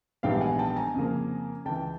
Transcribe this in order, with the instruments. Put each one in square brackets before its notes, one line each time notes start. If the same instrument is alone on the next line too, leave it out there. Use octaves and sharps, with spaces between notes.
[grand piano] A#1 G#2 E3 G3 B3 F5 G5
F#5 G#5
G5 A5
G#5 A#5
F2 C#3 F3 A#3
C#2 C#3 E3 G5 A5